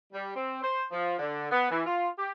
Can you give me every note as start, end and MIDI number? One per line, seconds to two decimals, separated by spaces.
0.13 0.34 55
0.36 0.60 60
0.62 0.85 72
0.91 1.15 53
1.19 1.46 50
1.51 1.70 59
1.70 1.86 52
1.86 2.08 65
2.19 2.31 67